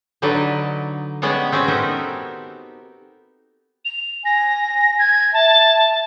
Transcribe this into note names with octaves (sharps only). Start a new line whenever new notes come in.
D3 F#3 D#4 B4 D5 D#5
G3 G#3 B3 C#4 D5 F#5
C4 C#4 F#4 G4 B4
B3 C4 D#4 A4 A#4
F7
G#5 A#6
G#6
E5 A5